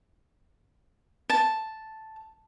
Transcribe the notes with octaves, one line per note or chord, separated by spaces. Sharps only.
A5